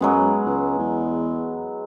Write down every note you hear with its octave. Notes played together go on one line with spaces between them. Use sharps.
F#2 F#3 G#3 B3
C#2
E2